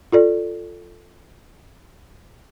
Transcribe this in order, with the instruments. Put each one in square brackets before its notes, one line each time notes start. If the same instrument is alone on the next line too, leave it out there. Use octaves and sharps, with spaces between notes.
[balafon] F4 A4 D5